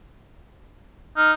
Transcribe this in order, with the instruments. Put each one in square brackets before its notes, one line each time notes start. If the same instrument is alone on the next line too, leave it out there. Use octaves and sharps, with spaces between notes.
[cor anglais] D#4 [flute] F6